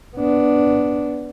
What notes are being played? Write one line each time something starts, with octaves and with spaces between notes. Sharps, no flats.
B3 D4